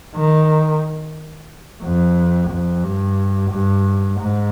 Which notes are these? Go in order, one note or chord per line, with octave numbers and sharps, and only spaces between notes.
D#3
F2
F2
G2
G2
G#2